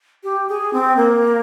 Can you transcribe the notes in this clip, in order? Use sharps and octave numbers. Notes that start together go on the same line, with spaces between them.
G4
G#4
C4
A#3